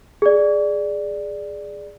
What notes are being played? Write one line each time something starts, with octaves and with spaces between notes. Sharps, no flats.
G#4 D5